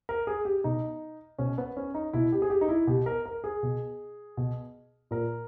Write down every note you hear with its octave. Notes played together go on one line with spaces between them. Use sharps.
A#4
G#4
G4
B2 D#4
B2 C#4
B3
C#4
D#4
B2 E4
G4
G#4
G4
D#4
E4
B2 G4
A#4
A#4
G#4
B2
B2
A#2 A#4